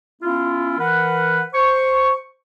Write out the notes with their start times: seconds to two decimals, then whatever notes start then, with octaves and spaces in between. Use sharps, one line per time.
0.22 B3 C#4 E4 F4
0.79 E3 A#4 B4 F#5
1.54 C5 C#6